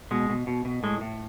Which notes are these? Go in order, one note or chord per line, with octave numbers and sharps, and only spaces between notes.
B2 G#3
B2
B2
B2
A2 G#3
A2